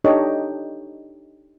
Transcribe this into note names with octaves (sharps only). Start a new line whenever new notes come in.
D4 D#4 G4 A4 C#5 D#5